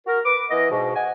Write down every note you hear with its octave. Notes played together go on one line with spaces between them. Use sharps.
F#4 A#4
B4 D6
E3 B3 D#5
G#2 B2
D#5 F#5 G#5